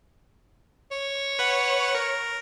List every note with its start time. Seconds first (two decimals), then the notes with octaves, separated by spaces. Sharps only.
0.91 C#5
1.39 B4 F#5
1.95 A#4